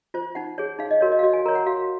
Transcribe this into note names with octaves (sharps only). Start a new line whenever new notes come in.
F4 C5
D#4 F#5
G#4 C#5
D#4 F5
D#5
F#4 A#4 C#5
D#5
F5
F#4 D#5
G#5
A#4 C#5 A#5
F#5
F#4 F5